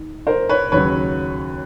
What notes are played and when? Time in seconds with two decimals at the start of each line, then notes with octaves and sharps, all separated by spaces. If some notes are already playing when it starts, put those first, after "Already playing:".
Already playing: D#3
0.27 A#4 C5
0.49 B4 C#5
0.72 D#2 C#3 F#3 B4 C#5